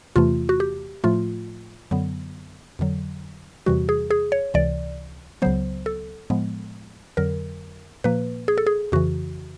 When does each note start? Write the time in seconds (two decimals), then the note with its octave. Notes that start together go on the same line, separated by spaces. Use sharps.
0.16 E2 C3 E3 A3 F4
0.49 F#4
0.60 G4
1.04 A2 F3 A3 F4
1.91 F#2 D3 F#3 B3
2.79 F2 D3 F#3
3.66 E2 C3 E3 G3 F#4
3.89 G#4
4.11 G#4
4.32 C#5
4.54 C#2 C3 E3 D5
5.42 C#2 C#3 F#3 B3 C5
5.86 A4
6.30 A2 F3 G#3 B3
7.17 F2 D3 F#3 A#4
8.04 A#2 F3 A#3 B4
8.48 G#4
8.58 A4
8.67 G#4
8.92 F2 C#3 E3 F#4